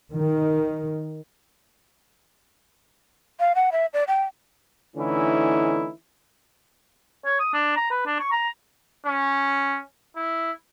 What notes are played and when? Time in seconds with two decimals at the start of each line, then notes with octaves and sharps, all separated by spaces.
0.13 D#3
3.40 F5
3.55 F#5
3.72 E5
3.93 D5
4.08 G5
4.97 D3 E3 A3 C#4 D#4 E4
7.26 C#5
7.40 D#6
7.54 D4
7.77 A#5
7.91 B4
8.06 D4
8.20 C#6
8.32 A#5
9.06 C#4
10.16 E4